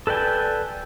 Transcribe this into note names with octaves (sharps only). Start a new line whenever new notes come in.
A4 B4 D5 G5 G#5